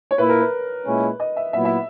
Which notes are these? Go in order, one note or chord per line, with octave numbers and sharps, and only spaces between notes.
C#5
A#2 A#3 E4 B4
A#4
B4
A#2 G#3 C#4 E4
D#5
E5
A#2 F#3 B3 E4 E5
E5